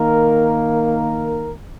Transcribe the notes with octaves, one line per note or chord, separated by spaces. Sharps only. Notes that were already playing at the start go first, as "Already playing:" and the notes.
Already playing: D#3 A#3 A#4
A#4